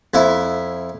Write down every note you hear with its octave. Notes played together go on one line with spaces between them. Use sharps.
F2 E4 E5